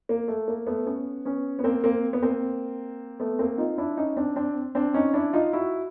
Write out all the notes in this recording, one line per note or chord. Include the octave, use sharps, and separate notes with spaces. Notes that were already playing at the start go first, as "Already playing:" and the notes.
A#3
A3
A#3
A3 B3
B3 C#4
B3 C#4
B3
A#3 C4
A#3 C4
B3
A#3 C4
A3 B3
A#3 C4
D#4 F4
D4 E4
C#4 D#4
C4 D4
C4 D4
C4 D4
C#4 D#4
D4 E4
D#4 F4
E4 F#4